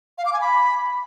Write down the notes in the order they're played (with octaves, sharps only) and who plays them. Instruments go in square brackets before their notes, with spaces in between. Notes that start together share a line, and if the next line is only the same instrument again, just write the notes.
[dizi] F5
D6
G#5
B5